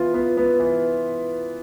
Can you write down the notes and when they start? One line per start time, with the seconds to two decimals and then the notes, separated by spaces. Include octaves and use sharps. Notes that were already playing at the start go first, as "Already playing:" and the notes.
Already playing: E3 B3 F4
0.14 B3
0.37 B3
0.60 E3